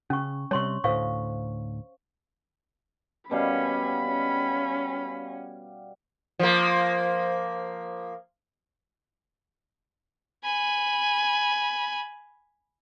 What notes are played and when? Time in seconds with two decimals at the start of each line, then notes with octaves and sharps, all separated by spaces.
0.10 C#3 C#4 C#6
0.51 C3 G3 C#5 C6 C#6
0.84 D2 A2 C5 F5 C#6
3.31 B2 G3 C#4 F5 B5
4.05 C#4
6.39 F3 A#3
10.44 G#5 B5